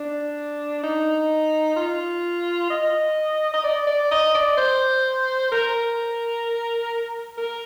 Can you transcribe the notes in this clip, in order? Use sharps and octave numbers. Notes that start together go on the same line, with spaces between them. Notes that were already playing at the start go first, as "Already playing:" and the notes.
Already playing: D4
D#4
F4
D#5
D#5
D5
D5
D#5
D5
C5
A#4
A#4